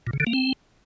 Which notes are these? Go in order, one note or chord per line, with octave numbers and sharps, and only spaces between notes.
A#2
C#3
D3
A#3
C4